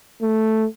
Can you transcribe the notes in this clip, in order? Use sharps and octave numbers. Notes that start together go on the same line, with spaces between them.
A3